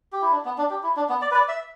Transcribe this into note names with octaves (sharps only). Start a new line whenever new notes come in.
G4
E4
D4
B3
D4
G4
E4
D4
B3
D5
B4
D5
E5